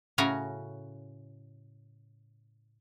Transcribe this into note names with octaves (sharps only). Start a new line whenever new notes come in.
A2 C#3 C#4 F#4 G#5 A#5